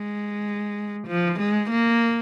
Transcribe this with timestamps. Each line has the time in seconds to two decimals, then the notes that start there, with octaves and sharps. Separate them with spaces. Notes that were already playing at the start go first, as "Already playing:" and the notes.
Already playing: G#3
1.08 F3
1.40 G#3
1.70 A#3